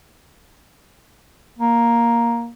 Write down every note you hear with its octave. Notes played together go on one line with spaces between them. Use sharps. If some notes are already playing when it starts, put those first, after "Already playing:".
A#3